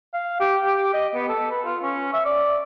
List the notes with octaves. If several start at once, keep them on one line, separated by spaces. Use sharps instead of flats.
F5
G4
G4
D#5
B3
A4
B4
F4
C#4
E5
D5